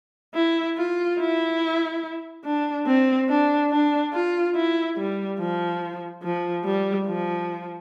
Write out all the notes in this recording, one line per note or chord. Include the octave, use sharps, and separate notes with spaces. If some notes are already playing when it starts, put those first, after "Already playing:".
E4
F4
E4
D4
C4
D4
D4
F4
E4
G3
F3
F3
G3
F3